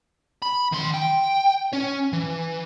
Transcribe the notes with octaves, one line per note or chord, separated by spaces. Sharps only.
B5
D#3 C6
G5
C#4 C#5
E3